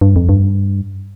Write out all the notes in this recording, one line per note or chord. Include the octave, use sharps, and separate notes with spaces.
G2
F2
G2